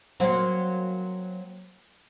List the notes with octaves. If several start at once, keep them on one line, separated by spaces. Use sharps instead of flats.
F#3 A#3 C4